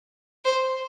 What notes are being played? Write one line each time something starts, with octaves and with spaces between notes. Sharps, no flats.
C5